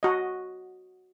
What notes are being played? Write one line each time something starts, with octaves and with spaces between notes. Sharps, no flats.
F#4 D#5